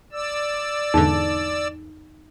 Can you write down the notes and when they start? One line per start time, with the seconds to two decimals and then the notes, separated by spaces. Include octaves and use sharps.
0.12 D5 E6
0.94 E2 G#2 D3 D#4